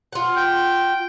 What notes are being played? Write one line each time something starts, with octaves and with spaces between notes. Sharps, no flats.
F4 F#5
G5